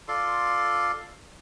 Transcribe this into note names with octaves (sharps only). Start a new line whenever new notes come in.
F4 A4 D5 C6